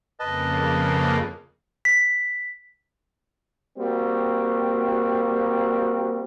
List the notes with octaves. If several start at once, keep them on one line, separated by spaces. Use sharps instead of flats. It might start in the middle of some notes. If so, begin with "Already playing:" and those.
F2 C#3 A#3 B4 D#5 A5
B6
G3 A#3 C4 F#4